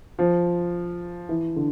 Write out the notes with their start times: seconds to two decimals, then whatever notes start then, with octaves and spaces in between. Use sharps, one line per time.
0.19 F3
1.29 E3
1.56 D3